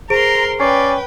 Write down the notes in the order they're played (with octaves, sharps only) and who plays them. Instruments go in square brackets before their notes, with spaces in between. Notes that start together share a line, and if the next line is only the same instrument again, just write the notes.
[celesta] G#4 C5 D7 [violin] A#4 C6 [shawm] A#5
[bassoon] C#4 [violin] B4 G5 [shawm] D5 [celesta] C7